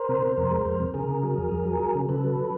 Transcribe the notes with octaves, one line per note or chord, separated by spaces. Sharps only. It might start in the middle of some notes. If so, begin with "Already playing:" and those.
Already playing: A#4 C5
C3
C3
F2
G#3
F2
C3
C#3 G#4 A#4
C#3
F#3
F2
F2
F#3
F#3
C#3
C#3 A4 B4
F#3